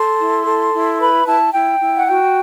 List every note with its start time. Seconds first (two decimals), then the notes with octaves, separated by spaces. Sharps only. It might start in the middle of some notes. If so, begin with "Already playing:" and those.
Already playing: A4 C6
0.20 E4
0.46 A4
0.74 E4
1.00 B4 B5
1.27 E4 A5
1.54 E4 G5
1.81 E4
1.97 F#5
2.07 F#4 G5